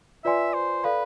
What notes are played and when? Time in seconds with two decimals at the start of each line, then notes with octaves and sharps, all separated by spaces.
0.25 F4 B4 D5 E5 G#5 C6
0.54 C5
0.84 A4 B4 D5 F5 B5